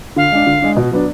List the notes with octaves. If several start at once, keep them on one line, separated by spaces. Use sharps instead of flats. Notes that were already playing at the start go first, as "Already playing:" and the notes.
D3 F5
G#3 D4
D3
G#3 D4
B2
F#3 B3 D4